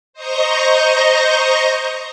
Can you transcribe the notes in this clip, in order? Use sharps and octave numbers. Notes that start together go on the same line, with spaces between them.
C5 D#5 A#5 C#6 G6 A#6